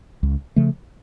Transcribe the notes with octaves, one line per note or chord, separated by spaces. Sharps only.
C#2
C#3 F3 A3